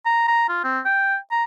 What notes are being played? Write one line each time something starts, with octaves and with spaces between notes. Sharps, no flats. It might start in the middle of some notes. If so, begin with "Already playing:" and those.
A#5
A#5
F4
C4
G5
A#5